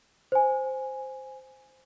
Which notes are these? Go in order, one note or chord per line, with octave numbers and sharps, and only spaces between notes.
C5 G#5